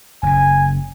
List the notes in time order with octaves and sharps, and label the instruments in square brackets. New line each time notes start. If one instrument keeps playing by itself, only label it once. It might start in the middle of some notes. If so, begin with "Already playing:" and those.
[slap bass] F#1 C#3 [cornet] G#5